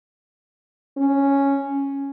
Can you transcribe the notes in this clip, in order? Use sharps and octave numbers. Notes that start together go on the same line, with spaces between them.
C#4